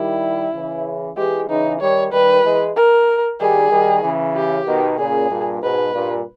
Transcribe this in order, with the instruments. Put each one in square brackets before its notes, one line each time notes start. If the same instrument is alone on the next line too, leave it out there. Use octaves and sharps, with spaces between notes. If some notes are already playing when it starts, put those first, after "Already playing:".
Already playing: [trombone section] D#3 G3 [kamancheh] E4
[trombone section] C#3 E3
[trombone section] E3 G#3 [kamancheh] G4
[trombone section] C#3 E3 [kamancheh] D#4
[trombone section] D#3 G3 [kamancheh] C#5
[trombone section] D#3 G3 [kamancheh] B4
[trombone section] E3 G#3
[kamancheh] A#4
[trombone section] D#3 G3 [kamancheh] G#4
[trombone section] D#3 G3
C#3 E3
[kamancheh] G4
[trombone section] B2 D#3
[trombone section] A#2 C#3 [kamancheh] G#4
[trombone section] G2 A#2
[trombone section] G#2 B2 [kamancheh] B4
[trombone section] G2 A#2